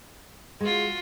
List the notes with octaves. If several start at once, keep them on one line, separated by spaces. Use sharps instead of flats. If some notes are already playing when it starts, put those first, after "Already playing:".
G#3 F4 F#4